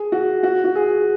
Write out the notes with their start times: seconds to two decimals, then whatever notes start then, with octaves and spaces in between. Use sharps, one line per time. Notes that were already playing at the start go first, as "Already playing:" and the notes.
Already playing: G#4
0.12 F#4
0.43 F#4
0.64 F#4
0.75 G#4